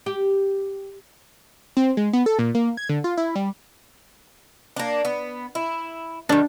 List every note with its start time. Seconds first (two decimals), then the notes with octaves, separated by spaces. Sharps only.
0.06 G4
1.77 C4
1.97 G#3
2.13 B3
2.26 A4
2.39 A#2
2.55 A#3
2.77 G#6
2.89 D3
3.04 F4
3.17 E4
3.35 G3
4.76 A#3 D4
5.05 B3
5.55 E4
6.29 D#3 G3 D4